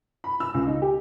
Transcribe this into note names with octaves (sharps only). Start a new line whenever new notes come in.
B5
E6
C#2
D#4
G4